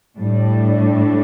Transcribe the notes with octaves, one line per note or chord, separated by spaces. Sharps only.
A2 G3 D4